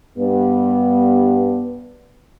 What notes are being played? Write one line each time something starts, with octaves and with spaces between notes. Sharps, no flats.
G2 B3